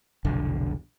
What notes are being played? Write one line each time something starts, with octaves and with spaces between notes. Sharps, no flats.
F1 B1 D3